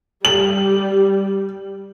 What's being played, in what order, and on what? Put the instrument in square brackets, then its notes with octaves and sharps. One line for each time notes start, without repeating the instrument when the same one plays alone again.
[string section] G3 [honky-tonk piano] F#7